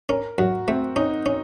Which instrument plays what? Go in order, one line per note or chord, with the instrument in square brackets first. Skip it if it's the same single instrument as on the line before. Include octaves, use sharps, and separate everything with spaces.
[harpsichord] C#4 [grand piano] A#4
[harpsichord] F#2 [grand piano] F#4
[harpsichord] A3 [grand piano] C4
[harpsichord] C#4 [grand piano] D#4
[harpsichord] C#4